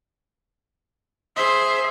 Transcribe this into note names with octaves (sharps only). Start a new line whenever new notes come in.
G#4 C5 E5